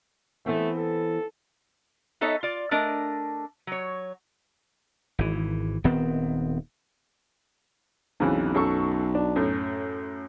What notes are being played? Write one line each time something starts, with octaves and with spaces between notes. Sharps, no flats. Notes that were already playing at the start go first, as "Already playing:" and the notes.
E3 A3 B3 C4
A4
B3 D#4 A4 C#5 D#5 E5
F4 D5
A3 D4 A#4 D#5
F#3 C#5
G#1 E3
D#1 D#3 B3 C4
B1 F2 C#3 E3
F#2 A4 C#6
D4
F#2 A2